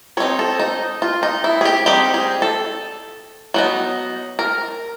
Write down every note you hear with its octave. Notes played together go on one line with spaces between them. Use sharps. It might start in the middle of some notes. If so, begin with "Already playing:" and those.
G3 C4 D#4 C#5
A4
D#4
F4
D#4
E4
G#4
G4
G3 C4 D#4 G4
G#4
A4
F#3 B3 D#4
A#4